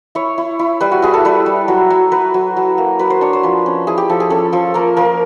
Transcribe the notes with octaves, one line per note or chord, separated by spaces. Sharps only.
E4 C#5
E4
E4
G3 B4
F#4
E4 G#4
A4
G3 B4
G3
F#3
F#3
F#3 B4
F#3
F#3
A#3
F#3 B4
C5
D4 C#5
C5
F3 B4
C#4
E4 G#4
G4
F3 A4
G#4
C#4 A4
F3 A4
A#3 A#4
F3 A#4